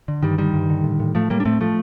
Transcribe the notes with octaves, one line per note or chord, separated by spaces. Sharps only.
D3
G2 D#3 G3
D3 D#3 G3
G2
D3
A2
A2
A2 F3 A3
A2 G3 A#3
D4
A2 A3 C4
A2 F3 A3